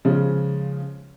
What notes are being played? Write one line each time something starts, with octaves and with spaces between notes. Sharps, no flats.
C#3 F3 G#3 C#4